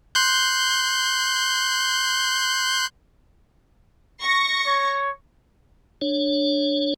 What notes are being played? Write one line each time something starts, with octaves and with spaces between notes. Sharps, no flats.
C6 F#6 G6
C#6 A#6
C#5
D4 C#5